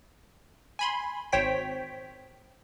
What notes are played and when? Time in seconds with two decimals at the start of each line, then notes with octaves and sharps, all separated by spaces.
0.79 G#5 B5 C6
1.32 G#1 C5 C#5 G5 B6